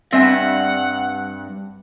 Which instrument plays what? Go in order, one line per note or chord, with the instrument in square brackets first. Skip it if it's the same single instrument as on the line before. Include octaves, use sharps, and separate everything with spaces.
[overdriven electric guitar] G2 [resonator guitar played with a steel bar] C4 E5 G#5 [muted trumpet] F#5